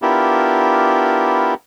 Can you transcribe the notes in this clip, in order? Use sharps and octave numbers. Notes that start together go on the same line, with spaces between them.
B3 D4 E4 F4 G4 A#4